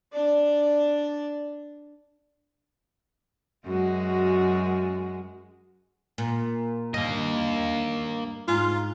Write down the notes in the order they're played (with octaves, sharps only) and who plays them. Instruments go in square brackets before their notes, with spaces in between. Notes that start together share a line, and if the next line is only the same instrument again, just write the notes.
[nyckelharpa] D4 D5
[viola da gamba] F#2 G#3 F#4
[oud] A#2
[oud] G2 [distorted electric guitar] A#3 D#5
[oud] G#2 [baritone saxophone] F4